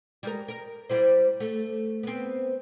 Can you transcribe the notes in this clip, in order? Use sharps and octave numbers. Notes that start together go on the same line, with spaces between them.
G3 G#3 A#4
A#4
G3 E4 C5
A3
B3 C4